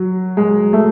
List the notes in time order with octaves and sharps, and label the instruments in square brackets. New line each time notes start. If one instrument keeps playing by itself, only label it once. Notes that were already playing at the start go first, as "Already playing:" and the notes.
Already playing: [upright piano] F#3
G#3
A3